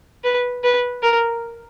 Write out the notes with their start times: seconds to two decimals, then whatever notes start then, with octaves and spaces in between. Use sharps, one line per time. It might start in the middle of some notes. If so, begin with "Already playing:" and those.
0.24 B4
0.64 B4
1.03 A#4